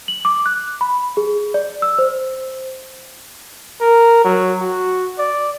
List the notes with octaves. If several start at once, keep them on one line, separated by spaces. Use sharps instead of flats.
F#7
D6
F#6
B5
G#4
D5
E6
C5
A#4
F#3
F#4
D5